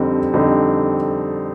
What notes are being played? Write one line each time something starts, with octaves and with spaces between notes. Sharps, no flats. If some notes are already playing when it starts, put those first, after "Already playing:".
Already playing: F2 D3 G3 C4 D#4
F2 D3 G3 C4 D#4